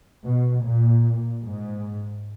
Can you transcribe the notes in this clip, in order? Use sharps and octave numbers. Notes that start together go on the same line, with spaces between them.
B2
A#2
G#2